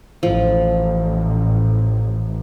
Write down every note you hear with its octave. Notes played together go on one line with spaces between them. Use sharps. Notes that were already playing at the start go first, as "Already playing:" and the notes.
A1 F3